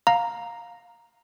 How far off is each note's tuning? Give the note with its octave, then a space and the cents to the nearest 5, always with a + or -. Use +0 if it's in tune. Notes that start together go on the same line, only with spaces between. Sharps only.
F5 +15 A#5 +0